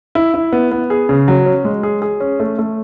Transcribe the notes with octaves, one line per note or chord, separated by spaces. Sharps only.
E4
E4
B3
B3
G#4
C#3
F#3
C#4
G#3
G#4
G#4
C#4
A3
A3